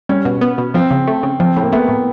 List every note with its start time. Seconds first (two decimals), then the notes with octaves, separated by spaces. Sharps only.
0.09 G3 C#4
0.25 B2
0.41 B3
0.58 B2
0.74 F3 C4
0.91 C#3
1.07 A3
1.23 C#3
1.40 F3 C4
1.56 A2
1.62 A#3
1.72 A3 B3
1.88 A2